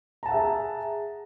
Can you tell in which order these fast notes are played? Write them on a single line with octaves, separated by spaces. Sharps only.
A#5 A5 F#5 E5 G#4